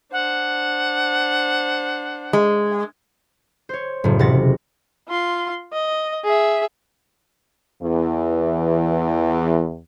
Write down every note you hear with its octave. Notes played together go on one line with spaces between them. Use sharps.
D4 C5 F#5
G#3
C5 C#5
F#1 A2
E1 C3 F#4 F#5 A6 A#6
F4 C6
D#5
G#4 E5
E2 E3